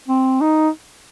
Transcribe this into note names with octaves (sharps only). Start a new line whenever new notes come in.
C4
D#4